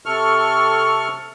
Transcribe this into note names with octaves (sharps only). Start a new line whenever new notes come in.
C3 A4 C#6 F6